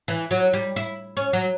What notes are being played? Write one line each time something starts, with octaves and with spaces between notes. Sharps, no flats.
E3
F#3
G3
E4
C#4
F#3